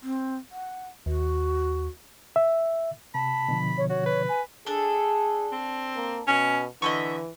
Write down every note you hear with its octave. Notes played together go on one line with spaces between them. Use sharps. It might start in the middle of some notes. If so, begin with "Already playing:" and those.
C4
F#5
D#2 F#4
E5
C3 A5 B5
B2 D3 F3
C#5
F#4 C#5
B4
G#5
D4 G#4 A4
C4
A#3
B2 C#4
D3 E3 D#5 E5 C#6